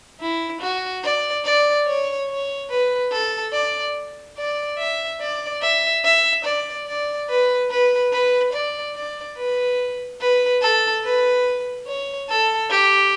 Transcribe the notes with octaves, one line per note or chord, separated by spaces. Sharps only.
E4
F#4
D5
D5
C#5
C#5
B4
A4
D5
D5
E5
D5
E5
E5
D5
D5
B4
B4
B4
D5
D5
B4
B4
A4
B4
C#5
A4
G4